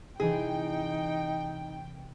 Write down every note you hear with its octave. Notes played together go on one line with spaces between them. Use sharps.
C3 E3 D#4 G#4 G5